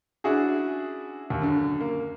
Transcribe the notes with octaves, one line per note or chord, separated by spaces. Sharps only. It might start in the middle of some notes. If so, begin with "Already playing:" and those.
C#4 D4 E4 F#4 G#4
D#2
F#2 D3
A#3